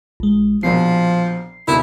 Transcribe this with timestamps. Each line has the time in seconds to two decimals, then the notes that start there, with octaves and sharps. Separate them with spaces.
0.20 A#1 G#3
0.63 A#1 B2 F3 C7
1.68 D2 B2 D#4 E4 A#4